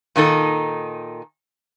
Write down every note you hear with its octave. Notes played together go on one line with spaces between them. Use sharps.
A#2 D#3 D#4 A4